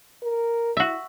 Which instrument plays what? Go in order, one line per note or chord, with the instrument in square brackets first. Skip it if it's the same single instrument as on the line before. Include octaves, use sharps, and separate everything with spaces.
[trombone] A#4
[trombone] E4 [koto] F#4 E5